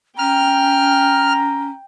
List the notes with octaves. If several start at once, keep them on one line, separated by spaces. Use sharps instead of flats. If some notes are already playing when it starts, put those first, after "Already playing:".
C#4 G5 A#5 F6